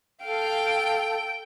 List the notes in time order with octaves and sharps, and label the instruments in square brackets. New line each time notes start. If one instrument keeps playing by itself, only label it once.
[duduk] A4 [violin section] F5 [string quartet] G5